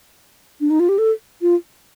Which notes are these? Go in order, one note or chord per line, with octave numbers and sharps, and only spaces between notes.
D4
D#4
F4
G4
A4
F4